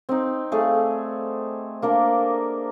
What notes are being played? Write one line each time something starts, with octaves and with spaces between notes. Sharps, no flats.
C4 D#4
A3 G#4 D5 F5
A#3 D4 A#4